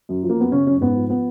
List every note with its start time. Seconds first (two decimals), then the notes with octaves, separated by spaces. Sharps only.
0.09 F#2
0.23 F3
0.30 A#3
0.38 F#2 B3
0.52 C#3 C#4
0.67 F#2 C#4
0.77 C#4
0.81 G#2 B3
0.96 F3
1.10 F3 B3